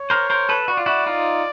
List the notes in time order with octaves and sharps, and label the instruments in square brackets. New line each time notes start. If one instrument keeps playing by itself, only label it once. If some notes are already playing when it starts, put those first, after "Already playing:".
Already playing: [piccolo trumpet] C#5
[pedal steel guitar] A#4 C5
A#4 C5
A4 B4
[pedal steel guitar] F#4 [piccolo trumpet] D5
[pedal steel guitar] F4
E4 F#4
D#4 F4